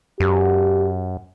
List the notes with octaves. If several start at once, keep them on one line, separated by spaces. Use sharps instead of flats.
F#2 G4